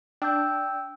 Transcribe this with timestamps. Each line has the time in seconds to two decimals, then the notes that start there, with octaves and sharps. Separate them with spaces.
0.22 D4 G5 E6 G6